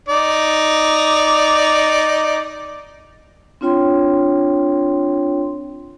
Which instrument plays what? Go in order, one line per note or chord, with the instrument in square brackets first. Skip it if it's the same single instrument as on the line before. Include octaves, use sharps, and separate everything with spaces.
[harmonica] D#4 D5
[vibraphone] C4 D4 F4 C#5 G5 C6